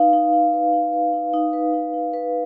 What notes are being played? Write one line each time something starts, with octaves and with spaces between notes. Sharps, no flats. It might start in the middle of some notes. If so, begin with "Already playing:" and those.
Already playing: D#4 B4 F5
D#4
D#4
B4
D#4
B4
D#4
D#4
B4
D#4
D#4
B4